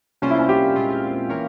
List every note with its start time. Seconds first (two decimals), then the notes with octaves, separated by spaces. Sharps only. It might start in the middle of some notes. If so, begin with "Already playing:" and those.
0.22 C3 G3 A#3 C#4 F4 C5
0.30 E4
0.39 C#4
0.49 G4
0.76 A#2 G#3 C4 F4
1.29 E3 A#3 F4 A#4 C#5